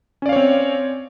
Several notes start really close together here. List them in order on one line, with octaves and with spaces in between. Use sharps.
C#4 D5 F5 C#5 C4